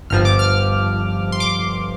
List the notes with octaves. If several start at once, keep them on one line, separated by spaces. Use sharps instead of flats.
G1 G2 F3 F6
D6
F6
C6
D6